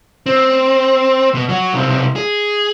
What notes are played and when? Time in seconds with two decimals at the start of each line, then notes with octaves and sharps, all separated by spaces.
0.26 C4
1.34 B2
1.49 F#3 F#4
1.73 B1 C3
2.16 G#4